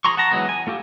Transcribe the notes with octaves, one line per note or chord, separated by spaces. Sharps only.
F3 G#4 A#5 C6 C#6
F#5 A5 A#5
E3 F#3 G#3 B3
G#5
A3 F4 G4 A4